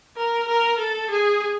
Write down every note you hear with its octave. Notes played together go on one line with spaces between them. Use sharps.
A#4
A#4
A4
G#4